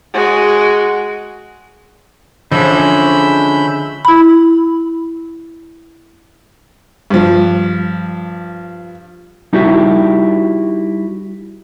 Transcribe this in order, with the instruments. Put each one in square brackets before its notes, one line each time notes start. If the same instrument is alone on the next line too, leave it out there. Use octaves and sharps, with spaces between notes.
[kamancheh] G#3 F#4
[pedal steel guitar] D3 C#4 [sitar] E3 F3 G#3 [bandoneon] B5 E6 G6
[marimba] E4 B5
[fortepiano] G2 F3
[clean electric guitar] G3 D#4 E4 F#4 G4